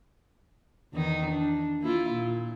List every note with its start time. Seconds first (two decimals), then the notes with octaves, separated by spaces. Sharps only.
0.94 E2 D#3 D#4
1.30 D4
1.81 A#3 E4 F4
2.12 A#2